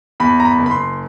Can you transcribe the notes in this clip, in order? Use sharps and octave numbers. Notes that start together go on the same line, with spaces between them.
E2 B5
A#5
B5
F#1
B5
C6